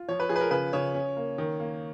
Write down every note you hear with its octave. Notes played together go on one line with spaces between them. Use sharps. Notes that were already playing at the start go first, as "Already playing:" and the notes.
Already playing: F4
F3 C#5
B4
F3 G#4
B4
A#4
C#3 B4
C#3 C#5
C#4
A#3
D#3
A#3